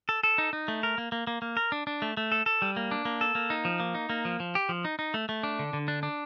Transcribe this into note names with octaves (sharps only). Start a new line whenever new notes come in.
A4
A4
D#4
D#4
A3
A#4
A#3
A#3
A#3
A#3
A#4
D4
D4
A3
A3
A4
A4
G3
A#3
D4
A#3
A4
A#3
D#4
F3
A#3
D#4
A#3
F3
F3
G4
F3
D#4
D#4
A3
A3
D4
D3
D3
D4
D4